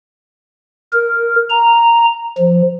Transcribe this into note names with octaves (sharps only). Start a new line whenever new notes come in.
A#4
A#5
F3